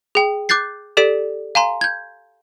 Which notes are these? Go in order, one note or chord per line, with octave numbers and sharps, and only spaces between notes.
G#4 G5
D6 F#6 G6 A6 C7
G4 A4 D5 B6 D7
F5 G#5 A#5 C6
G6 G#6